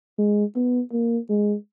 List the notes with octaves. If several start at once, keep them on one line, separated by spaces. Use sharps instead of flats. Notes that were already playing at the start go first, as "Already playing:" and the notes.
G#3
B3
A#3
G#3